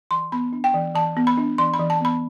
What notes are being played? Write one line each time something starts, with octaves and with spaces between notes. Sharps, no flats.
E3 C6
B3 B5
D4
G5
E3
E3 A5
B3
B5
D4
E3 C6
B5
E3
A5
B3 B5